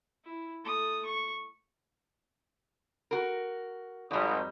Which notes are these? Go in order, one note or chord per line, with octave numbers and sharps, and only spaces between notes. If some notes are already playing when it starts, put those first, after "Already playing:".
E4
A3 D#6
C#6
F#4 A#4
G#1 F2 G3 D#4